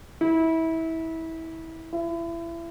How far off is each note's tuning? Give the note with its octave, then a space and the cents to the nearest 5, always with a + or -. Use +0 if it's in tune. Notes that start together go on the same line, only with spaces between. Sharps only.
E4 -25
E4 +30